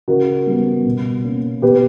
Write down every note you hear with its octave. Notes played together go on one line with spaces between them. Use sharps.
C#3 F#4 A#4
G3 B3
B2
A#3 C#4
B2 G4 B4